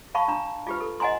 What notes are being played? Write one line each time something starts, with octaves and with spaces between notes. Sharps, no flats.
F5 A5 B5 C#6
D4 A#5
F4 G4 B4
A4
D#5 F#5 G#5 A#5 C6